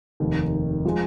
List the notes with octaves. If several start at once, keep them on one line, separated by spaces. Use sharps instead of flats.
F1 D#2 D#3
F3 G#3